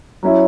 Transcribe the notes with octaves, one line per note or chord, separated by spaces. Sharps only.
F#3 C#4 E4